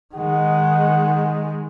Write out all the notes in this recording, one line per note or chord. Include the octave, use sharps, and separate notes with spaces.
D#3 G#3 F#5